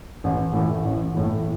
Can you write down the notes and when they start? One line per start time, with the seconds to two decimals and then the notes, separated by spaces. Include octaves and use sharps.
0.24 A1
0.53 A2 E3
0.84 A1
1.15 A2 E3